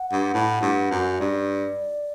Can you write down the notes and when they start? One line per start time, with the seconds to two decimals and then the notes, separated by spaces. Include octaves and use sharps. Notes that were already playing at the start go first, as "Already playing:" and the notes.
Already playing: F#5
0.12 G2
0.34 A2
0.61 G2
0.91 F#2
1.20 G2 D5